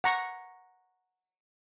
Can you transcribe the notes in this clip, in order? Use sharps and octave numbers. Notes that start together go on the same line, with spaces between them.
F#5 A#5 C#6